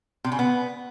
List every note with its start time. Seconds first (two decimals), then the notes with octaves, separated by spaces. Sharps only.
0.24 C3
0.32 C#3
0.39 B3